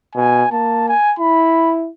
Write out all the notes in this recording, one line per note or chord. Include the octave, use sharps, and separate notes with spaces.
B2 G#5
A#3 A5
G#5
E4 B5